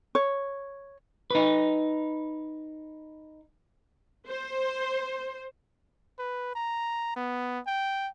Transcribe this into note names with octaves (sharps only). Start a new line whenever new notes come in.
C#5
D#4 B4
C5
B4
A#5
B3
G5